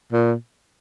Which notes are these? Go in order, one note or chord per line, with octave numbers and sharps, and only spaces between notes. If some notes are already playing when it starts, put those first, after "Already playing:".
A#2